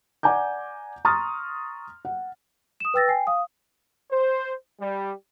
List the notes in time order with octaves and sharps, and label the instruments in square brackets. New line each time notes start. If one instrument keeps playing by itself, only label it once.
[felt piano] D5 F#5 G#5 A#5 D6 G6
A#5 C6 C#6 D#6 F6 A6
F#5
[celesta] D#6 E7
B4 G5 E6 A6 A#6
G5 G#5 C7
F5 D#6
[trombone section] C5
G3